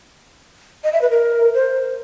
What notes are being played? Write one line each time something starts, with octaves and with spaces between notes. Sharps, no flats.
D#5
E5
B4
A#4
C5